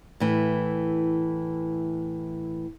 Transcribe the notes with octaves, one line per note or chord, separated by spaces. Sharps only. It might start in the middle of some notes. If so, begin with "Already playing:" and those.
A2 E3